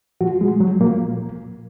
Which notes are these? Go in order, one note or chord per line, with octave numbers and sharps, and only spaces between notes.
A#2 F3 F#4
G#3
F#3
A#2 F3 A#3